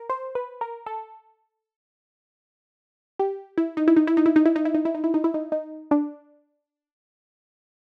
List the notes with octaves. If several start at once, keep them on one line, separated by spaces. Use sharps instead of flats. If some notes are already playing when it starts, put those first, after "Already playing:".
Already playing: A#4
C5
B4
A#4
A4
G4
E4
D#4
E4
D#4
E4
D#4
E4
D#4
E4
D#4
E4
D#4
E4
D#4
E4
D#4
E4
D#4
D#4
D4